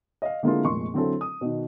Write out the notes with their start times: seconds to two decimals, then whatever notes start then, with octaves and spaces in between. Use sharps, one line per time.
0.22 D#5 F5
0.43 D3 G#3 A#3 C4 E4 F4
0.64 F1 A#2 G#3 C6 C#6
0.94 D3 F#3 C4 E4 A4
1.21 D#6
1.41 B2 D#3